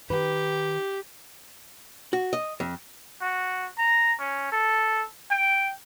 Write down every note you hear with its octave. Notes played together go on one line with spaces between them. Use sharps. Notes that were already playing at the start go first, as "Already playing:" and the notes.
D#3 G4 B4
F#4
D#5
F2
F#4
A#5
C#4
A4
G5